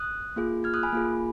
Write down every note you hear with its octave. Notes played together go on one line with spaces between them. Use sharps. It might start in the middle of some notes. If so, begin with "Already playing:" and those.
Already playing: D#6 F#6
A#3 F4 G#4
F6 G#6
D#6 F#6
G#5 B5
A#3 F4 G#4